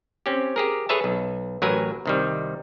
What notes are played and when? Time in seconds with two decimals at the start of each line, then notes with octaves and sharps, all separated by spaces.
0.26 C4 C#4 G4
0.56 G4 G#4 A#4
0.89 G#4 A4 B4 C#5 E5 A5
1.04 B1
1.62 A1 F#3 A#4 B4 G#5
2.06 C2 D#3 G3